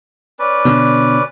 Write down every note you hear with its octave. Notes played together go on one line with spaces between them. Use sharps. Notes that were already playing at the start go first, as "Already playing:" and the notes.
C#4 B4 D5
B2 D3